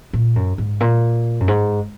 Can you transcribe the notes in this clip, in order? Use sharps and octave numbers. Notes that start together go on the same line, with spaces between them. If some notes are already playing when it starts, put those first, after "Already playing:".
A#2
F#2
G#2
A#2
F#2
G#2